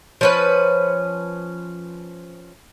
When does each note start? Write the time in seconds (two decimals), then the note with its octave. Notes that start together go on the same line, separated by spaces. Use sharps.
0.21 F3 C#4 B4